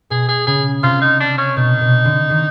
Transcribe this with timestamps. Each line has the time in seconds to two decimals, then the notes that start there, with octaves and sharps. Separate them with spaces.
0.10 B2 G#4
0.29 G#4
0.47 C#3 G#4
0.83 C3 F4
1.01 D#4
1.20 D4
1.38 C#4
1.56 B2 D#4
1.81 B2
2.05 D3
2.30 D#3